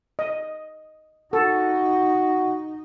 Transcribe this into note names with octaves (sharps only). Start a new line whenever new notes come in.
D#5
D#4 F#4 A4